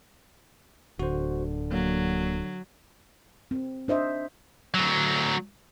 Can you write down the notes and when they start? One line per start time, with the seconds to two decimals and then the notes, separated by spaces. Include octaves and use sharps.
0.99 D1 D3 F#4 C5
1.72 F#3 A#3
3.51 C4
3.88 D4 C5 D#5 E5
4.74 D2 F#3